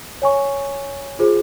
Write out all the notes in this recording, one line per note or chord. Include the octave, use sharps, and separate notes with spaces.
C#5 G#5 C#6
F4 G#4 C5